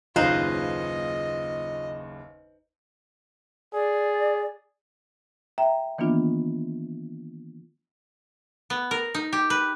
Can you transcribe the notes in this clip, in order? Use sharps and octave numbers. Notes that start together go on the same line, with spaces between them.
F#1 D#2 C#3 D#4 F4 B4 C5 D#5
G#4 D5
E5 G5 A#5
D#3 E3 A#3 B3 D4 F4
B3
A#4
D#4
G4
B4